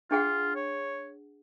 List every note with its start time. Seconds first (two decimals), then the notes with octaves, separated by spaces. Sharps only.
0.11 D4 F4 G#4 F#5
0.55 C#5